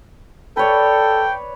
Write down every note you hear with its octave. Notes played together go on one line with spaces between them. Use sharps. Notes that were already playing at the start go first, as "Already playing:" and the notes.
A4 B4 C#5 D5 G5